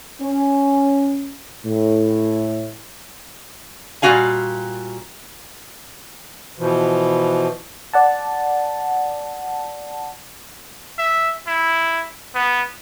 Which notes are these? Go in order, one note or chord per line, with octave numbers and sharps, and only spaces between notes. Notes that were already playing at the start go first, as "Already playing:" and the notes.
C#4
A2
A#2 G3 C4 F#4 F5 G#5
B2 E3 F3
D5 F#5 A5
E5
E4
B3